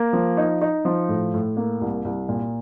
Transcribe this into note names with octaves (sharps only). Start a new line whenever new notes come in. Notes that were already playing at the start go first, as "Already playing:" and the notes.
Already playing: A#3
F3
D#4
D#4
F3
A2
A2
A#3
C2
C2
A#2